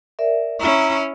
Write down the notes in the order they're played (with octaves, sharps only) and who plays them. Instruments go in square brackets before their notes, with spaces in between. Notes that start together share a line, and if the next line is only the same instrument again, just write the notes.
[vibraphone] A#4 D5 E5
[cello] C#4 E4 [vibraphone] A#5 C#6